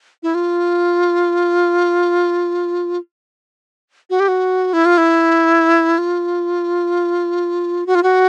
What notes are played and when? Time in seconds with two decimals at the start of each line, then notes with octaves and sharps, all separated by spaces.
0.23 E4
0.35 F4
4.10 F#4
4.20 G4
4.28 F#4
4.73 E4
4.85 F4
4.98 E4
5.98 F4
7.87 F#4
7.95 F4
8.03 F#4